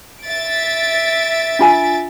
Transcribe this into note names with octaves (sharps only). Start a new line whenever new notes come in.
E5 A6 D7
D4 F4 G#5